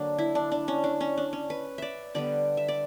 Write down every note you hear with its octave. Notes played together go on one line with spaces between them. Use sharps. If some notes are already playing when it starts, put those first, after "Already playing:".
Already playing: D3 F#3 A#3 D4
E4
D4
D4
C#4
D4
C#4
D4
C#4
B4
D5 E5
D3 G3 B3 D5
E5
D5